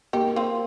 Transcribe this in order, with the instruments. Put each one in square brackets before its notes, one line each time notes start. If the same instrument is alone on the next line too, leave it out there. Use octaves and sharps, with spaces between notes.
[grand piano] A#3 [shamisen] D#4 G4
[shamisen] C4 F4